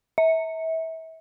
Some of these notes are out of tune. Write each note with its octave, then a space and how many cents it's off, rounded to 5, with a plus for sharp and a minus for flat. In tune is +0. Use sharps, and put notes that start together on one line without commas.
E5 -30